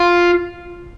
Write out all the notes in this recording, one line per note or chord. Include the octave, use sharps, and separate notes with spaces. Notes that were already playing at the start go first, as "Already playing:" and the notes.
Already playing: F4